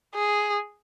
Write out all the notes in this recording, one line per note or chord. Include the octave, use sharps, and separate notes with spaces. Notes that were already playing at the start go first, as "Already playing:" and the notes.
G#4